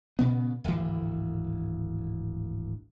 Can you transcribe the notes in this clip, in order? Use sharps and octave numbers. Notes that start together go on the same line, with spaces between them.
A#2 C#3 B3
D1 G#1 D2 E3